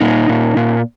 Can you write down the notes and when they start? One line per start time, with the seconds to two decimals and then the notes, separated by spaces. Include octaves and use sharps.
0.01 A#2 D#4
0.29 A#2
0.57 A#2